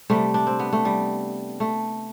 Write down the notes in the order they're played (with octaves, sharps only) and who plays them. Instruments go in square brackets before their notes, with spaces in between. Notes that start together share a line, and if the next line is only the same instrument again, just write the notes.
[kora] C3 G3 A3
D4
C4
B3
A3
G3
A3